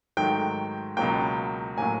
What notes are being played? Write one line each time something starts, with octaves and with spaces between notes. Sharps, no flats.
G#2 D#3 F#3 A3 G5
C#2 B2 F#3 A#3 G5
A2 F#3 A#3 G#5